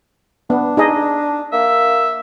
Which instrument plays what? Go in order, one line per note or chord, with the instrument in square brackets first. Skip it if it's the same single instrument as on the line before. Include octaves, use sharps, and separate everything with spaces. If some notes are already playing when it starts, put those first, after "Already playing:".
[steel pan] B3 [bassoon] D4
[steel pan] D#4 G#4 D#5
[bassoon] A#3 [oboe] E5